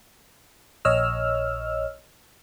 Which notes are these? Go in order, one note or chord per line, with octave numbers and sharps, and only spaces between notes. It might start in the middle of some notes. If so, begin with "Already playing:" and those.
A#1 C#5 D#5 E6 F6